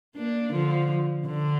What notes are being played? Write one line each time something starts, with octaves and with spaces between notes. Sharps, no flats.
A#3 D4
D3 F3
D3